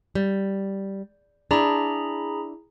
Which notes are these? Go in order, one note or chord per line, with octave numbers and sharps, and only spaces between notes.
G3
D4 E4 G#4 A#5 B5